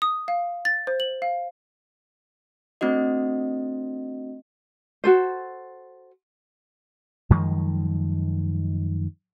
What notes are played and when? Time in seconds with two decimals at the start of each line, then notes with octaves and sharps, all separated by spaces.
0.02 D#6
0.28 F5
0.65 A6
0.87 C5
1.00 F#7
1.22 F5
2.81 A3 C4 D4 F#4 D#5
5.04 F#4 A4 C5
7.30 F#2 D#3 F3 G#3